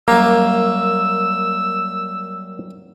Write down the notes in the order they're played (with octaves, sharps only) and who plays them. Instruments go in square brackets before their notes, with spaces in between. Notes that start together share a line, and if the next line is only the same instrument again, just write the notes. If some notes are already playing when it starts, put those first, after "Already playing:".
[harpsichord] F#2 G3 G4 [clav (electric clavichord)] A#3 [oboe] E6